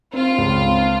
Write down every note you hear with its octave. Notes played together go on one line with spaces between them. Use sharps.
C4 F4
C#2
C4